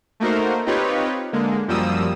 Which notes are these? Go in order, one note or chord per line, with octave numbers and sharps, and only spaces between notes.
A3 A#3 D#4 F#4 A#4 C5
C4 D#4 F4 G4 B4 C#5
D3 G#3 A#3
F#2 F3 G3 A#3 D#6 E6